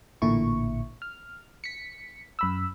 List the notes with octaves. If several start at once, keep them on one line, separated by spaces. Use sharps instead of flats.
A1 A#2 D3 E4 C#6
F6
B6 C#7
F#2 B5 E6